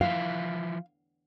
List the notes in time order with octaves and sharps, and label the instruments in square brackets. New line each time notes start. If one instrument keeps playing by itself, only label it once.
[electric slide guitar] E3 F3 E4 [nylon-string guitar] F5